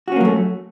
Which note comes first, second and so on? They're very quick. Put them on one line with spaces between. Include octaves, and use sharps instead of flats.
F#4 C#4 A#3 F#3 A3